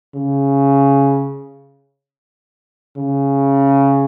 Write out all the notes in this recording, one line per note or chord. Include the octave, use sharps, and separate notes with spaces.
C#3
C#3